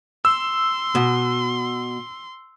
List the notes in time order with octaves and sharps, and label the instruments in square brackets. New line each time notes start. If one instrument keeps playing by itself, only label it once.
[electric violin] C6 [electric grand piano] E6
[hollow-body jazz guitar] B2